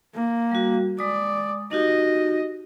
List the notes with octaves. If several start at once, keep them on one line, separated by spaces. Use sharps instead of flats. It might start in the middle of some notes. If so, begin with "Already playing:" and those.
A#3
G3 F#4
G#3 D5 D#6
D#4 F#4 G4 D#5